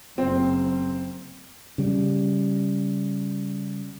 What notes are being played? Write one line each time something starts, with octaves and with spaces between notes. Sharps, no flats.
F#1 C4
C#3 G3